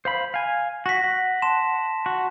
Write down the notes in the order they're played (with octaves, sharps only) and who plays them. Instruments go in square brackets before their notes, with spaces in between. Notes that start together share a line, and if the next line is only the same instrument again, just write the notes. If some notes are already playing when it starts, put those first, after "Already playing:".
[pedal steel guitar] C5 F5 B5
F5 G#5
[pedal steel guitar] F#4 [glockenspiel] A#6 B6
[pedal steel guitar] F#5
[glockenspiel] A5 C6 E7
[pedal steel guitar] F#4